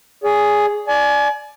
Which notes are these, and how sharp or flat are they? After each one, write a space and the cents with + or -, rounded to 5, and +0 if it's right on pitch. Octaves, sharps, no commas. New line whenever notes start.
G#4 +0 D5 -45
D5 +0 G#5 +35